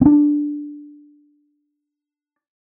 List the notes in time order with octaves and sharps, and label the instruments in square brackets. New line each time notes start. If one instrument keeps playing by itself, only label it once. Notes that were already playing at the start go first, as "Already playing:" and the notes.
[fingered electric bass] C4 D4